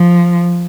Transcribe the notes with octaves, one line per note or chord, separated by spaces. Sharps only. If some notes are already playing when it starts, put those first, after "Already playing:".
Already playing: F3